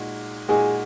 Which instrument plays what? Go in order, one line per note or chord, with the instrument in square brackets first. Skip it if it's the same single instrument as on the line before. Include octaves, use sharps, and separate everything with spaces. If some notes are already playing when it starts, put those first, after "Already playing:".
Already playing: [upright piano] A#2 G#3 D#4 F#4
[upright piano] A#2 G#3 D#4 F#4 [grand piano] G#4